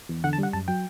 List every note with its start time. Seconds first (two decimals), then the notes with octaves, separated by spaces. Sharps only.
0.09 E2
0.24 D3 F#5
0.33 A5
0.38 G3 F#5
0.53 F#2 A5
0.68 F#3 G5